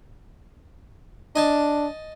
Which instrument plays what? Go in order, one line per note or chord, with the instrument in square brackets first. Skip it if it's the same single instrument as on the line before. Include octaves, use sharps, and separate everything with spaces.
[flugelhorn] D4 [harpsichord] D#5 G#5 A5